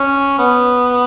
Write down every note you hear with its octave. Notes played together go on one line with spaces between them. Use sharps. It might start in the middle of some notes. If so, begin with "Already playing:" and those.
Already playing: C#4
B3